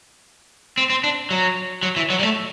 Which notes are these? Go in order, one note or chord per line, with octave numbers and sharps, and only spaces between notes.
C4
C4
D4
F#3
F#3
E3
F#3
G3
A3